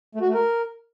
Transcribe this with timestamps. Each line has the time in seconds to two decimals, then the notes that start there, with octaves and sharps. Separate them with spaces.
0.15 A3
0.21 F#4
0.28 A3
0.34 A#4